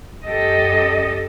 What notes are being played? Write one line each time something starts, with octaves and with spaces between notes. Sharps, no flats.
F#2 G4 A4 D#5